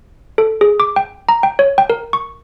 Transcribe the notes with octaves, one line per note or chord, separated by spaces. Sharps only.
A4
G#4
D6
G5
A#5
G5
C#5
G5
A#4
C#6